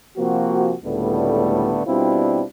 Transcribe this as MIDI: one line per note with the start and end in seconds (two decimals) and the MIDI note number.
0.18 0.74 48
0.18 0.74 53
0.18 0.74 58
0.18 0.74 60
0.18 0.74 66
0.85 1.81 37
0.85 1.81 45
0.85 1.81 50
0.85 1.81 55
0.85 1.81 57
0.85 1.81 59
1.87 2.43 47
1.87 2.43 55
1.87 2.43 60
1.87 2.43 62
1.87 2.43 64
1.87 2.43 65